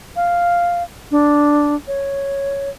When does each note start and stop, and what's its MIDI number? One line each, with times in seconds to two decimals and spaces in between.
0.16 0.83 77
1.11 1.75 62
1.88 2.70 73